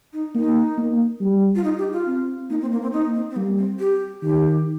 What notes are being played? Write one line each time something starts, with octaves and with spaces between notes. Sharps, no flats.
D#4
A#3 D#4
A#3
G3
F4
D#4
G4
F4
C4
A#3 D#4
C4
A#3
C4
A#3 D#4
C4
C4
G3 A#3
C4
G4
D#3 G4